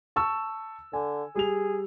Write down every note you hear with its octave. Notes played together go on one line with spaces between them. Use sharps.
A5 C#6 E6
D3 G#5
G3 G#4 F7